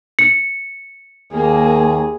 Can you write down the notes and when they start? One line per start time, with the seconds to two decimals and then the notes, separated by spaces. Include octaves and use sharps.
0.19 C#7
1.33 D#2 A#3 G#4